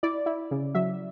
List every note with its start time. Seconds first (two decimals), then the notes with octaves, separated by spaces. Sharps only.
0.03 E4 D5
0.26 E4
0.51 C#3
0.75 F#3 E5